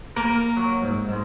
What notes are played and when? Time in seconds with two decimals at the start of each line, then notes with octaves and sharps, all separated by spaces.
0.16 A#3 A#4
0.57 F#3
0.82 G#2
1.09 G#2 G#3